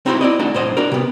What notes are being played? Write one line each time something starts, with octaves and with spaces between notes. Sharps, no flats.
C4 D#4 E4 F#4 A4 C5
E4 D5 D#5
A3 D4 D#4 F#4
B1 A2 C5 D#5
D4 F#4 A#4
C3 B3